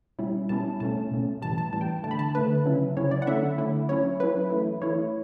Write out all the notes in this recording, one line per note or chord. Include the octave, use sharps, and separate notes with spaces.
B2 G3 C#4 E4
B2 G3 C#4 E4 A5
B2 A3 C#4 A5
B2 A3 C#4
A2 E3 G3 A5
A5
A2 E3 G3 A5
G5
A5
D3 A3 D4 A5
B5
A5
D3 A3 D4 B4
C#3 F#3 C#4 E4
C#3 F#3 C#4 E4 C#5
D5
F#5
D3 A3 C#4 E4 E5
D3 A3 C#4 E4
F#3 C#4 E4 C#5
F#3 C#4 E4 B4
E3 A3 E4
E3 A3 E4 C#5